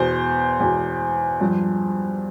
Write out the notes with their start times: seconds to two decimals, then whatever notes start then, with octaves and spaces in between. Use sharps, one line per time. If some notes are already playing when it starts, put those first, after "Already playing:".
Already playing: E2 B2 C5
0.60 E2 B2
1.40 G2 F3